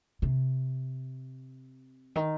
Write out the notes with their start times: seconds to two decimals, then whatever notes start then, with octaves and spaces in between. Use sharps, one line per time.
0.22 C3
2.15 D#3